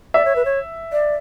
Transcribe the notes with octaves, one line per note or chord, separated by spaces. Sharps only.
D5 E5
C#5
B4
C#5
D5